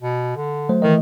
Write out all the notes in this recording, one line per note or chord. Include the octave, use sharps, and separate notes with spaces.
B2
D3
F#3 A3 C5
D#3 E3 A3 D#5